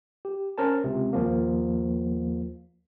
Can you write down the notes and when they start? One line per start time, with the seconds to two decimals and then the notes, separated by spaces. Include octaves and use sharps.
0.25 G4
0.58 C#4 A#4 C5 A5
0.84 C#2 C3
1.13 D#2 F3 A#3